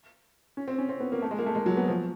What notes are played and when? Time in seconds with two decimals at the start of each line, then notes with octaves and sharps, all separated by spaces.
0.57 C#4
0.68 C4
0.78 C#4
0.89 C4
1.00 B3
1.12 A#3
1.22 A3
1.31 G#3
1.39 A#3
1.46 A3
1.55 G#3
1.66 F#3
1.77 B3
1.88 F3